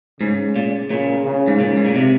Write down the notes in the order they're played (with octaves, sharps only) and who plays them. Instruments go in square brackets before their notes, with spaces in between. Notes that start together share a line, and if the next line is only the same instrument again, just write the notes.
[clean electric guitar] G#2 [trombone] C#3
[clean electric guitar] A#2
[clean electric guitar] A#2 [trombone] C#3
[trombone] C#3
[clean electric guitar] G#2
[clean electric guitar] A#2 [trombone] C#3
[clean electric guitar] G#2
A#2
C3